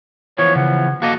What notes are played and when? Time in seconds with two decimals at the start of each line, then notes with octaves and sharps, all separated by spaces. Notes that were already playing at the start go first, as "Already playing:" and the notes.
0.38 E3 F3 B3 C#5
0.56 C#3 F#5
1.02 A#3 F#4 A4 D#5